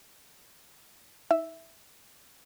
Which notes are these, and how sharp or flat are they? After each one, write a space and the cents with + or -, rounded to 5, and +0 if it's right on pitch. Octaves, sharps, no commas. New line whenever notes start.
D#4 +40 E5 +0